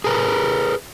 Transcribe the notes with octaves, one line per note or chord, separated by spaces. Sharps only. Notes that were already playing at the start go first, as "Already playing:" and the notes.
G#4 A#4 B4